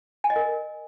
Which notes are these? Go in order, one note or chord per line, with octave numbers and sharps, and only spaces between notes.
G#5
D#5
A#4